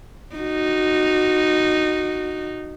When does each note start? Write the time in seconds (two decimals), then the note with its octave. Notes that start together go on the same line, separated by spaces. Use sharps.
0.35 D#4 F#4